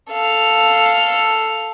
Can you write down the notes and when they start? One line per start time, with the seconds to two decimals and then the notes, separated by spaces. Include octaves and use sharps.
0.11 A4 F5